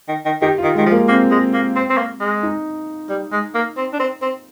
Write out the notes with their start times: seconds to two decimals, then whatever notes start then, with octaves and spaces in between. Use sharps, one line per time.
0.08 D#3
0.25 D#3
0.41 D#3 G4
0.58 F4
0.63 D#3
0.75 D#3 G#3
0.86 F3
0.92 A#3
1.08 A#3 C4
1.31 G#3
1.53 A#3
1.76 C4
1.90 C4
1.98 A#3
2.20 G#3
2.43 D#4
3.10 G3
3.32 G#3
3.54 A#3
3.77 C4
3.93 D4
3.99 C4
4.22 C4